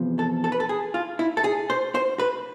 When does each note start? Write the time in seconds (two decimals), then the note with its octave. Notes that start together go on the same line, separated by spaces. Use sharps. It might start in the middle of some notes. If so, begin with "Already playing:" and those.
Already playing: E2 C3 F3
0.19 A4
0.44 A4
0.52 B4
0.60 A4
0.69 G#4
0.94 F4
1.19 E4
1.37 A4
1.44 G#4
1.70 C5
1.95 C5
2.19 B4